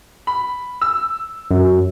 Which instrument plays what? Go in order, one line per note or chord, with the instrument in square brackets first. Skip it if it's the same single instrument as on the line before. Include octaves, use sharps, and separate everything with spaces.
[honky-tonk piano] B5
E6
[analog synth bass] F#2